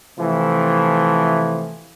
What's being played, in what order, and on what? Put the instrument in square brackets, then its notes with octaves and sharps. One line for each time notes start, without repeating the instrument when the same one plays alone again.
[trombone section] C3 E3 F3 A3